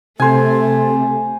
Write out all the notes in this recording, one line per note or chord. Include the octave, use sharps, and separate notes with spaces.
C3 A3 A4 C5 G#5